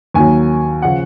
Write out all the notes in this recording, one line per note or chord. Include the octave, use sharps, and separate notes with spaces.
D#2 D#3 F#3 G#5
C#3 F3 F#5